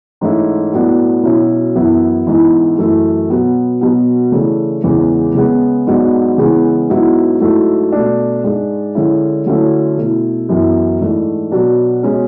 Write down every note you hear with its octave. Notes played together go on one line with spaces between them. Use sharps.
G#2 E3 A3 C#4 E4
A2 F#3 B3 D4
B2 F#3 C#4 E4
F#2 E3 B3 E4
G#2 E3 G#3 B3 E4
F#2 E3 A3
B2 F#3 B3
B2 F#3 B3
C#3 E3 A3 D4
E2 C#3 E3 G#3 B3
C#3 G#3 B3
G#2 F#3 B3 D4
C#3 E3 G#3 B3
G#2 F#3 B3 E4
G#2 F#3 A3 E4
B2 A3 D4
G#2 G#3 D4
D3 G#3 C#4 E4
D3 F#3 A3 C#4 E4
B2 A3 E4
F#2 E3 B3
G#2 E3 A3 D4
B2 F#3 B3 D4
B2 G#3 C#4